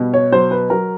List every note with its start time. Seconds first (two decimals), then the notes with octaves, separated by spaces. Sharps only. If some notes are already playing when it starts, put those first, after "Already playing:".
Already playing: B2 G3
0.14 C#5
0.32 F#3 C5
0.51 B4
0.70 F#3 A#4